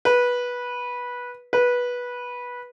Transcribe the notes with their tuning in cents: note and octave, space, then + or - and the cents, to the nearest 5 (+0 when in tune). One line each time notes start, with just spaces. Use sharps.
B4 -15
B4 -15